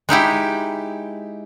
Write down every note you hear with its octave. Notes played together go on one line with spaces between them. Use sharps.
G#3 D#4 E4 G4